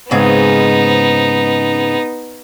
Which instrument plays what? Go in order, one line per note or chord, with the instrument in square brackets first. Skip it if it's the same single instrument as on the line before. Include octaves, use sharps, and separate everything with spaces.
[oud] G#2 C#3 C4 [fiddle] B3 D#4